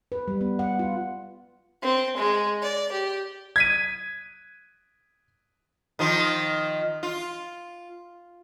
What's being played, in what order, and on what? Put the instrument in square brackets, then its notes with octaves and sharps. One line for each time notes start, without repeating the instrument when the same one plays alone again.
[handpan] B4
G3
B3
F#5
F4
[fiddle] C4
G#3
D5
G4
[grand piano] G#6 B6 D#7
[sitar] D#3 F3 F4
F4